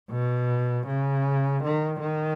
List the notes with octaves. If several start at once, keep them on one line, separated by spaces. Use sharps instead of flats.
B2
C#3
D#3
D#3